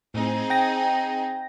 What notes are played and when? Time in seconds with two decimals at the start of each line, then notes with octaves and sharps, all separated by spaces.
0.14 A2 C4 D#4 G#4
0.50 G5 A#6